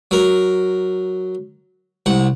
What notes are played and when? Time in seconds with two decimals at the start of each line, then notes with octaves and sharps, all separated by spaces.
0.11 F#3 A#4
2.06 C2 F#5